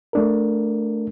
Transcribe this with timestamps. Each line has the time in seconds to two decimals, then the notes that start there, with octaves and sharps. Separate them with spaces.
0.13 A3 D4 A#4